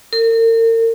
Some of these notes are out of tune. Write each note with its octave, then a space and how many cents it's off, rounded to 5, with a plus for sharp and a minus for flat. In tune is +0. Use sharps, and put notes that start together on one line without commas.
A#4 -40